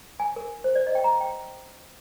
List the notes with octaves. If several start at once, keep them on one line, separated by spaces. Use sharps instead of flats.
G#5
A#4
C5
D5
D#5
G5
A#5
G5